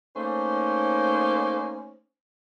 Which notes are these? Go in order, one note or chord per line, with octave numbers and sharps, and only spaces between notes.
A3 A#3 C#4 D#4 C5